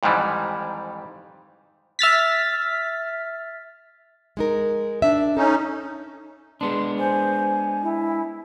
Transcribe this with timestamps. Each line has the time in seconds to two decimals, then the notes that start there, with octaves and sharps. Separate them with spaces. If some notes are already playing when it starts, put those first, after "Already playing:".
0.03 F2 G#2 D#3 E3 G3
1.99 E5 F6 A6 B6
4.37 G#3 D#4 A#4
5.02 D4 E5
5.37 C#4 D#4 A4
6.61 G#3 B3 D4 C6
6.99 C5 G#5
7.83 E4